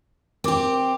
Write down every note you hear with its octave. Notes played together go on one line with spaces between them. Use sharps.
C4 G4 A#4 D6